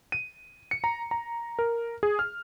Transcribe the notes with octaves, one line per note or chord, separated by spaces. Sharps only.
D#7
C#7
A#5
A#5
A#4
G#4
F6